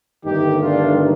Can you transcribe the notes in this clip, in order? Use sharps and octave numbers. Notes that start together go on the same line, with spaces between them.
G1 G2 D#3 A3 D#4 G4
D4 F4